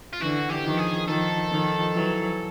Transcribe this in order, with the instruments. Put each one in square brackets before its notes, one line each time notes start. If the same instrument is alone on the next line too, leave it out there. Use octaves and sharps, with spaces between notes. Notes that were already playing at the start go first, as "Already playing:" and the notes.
[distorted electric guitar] F4
[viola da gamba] D3 E3 [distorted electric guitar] F#4
[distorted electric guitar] G4
[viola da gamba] D#3 F3
[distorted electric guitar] G#4
[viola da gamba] D#3 F3 [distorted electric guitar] A4
[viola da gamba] D#3 F3
E3 F#3